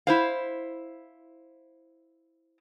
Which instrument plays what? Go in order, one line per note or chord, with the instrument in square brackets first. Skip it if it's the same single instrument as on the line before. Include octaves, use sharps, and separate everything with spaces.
[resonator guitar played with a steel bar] E4 C5 F5